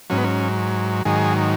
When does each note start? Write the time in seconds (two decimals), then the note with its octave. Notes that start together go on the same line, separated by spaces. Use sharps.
0.10 G#2 F#3 C#4
0.18 B3
0.24 C#4
1.05 G#2 D#3 F#3 G#4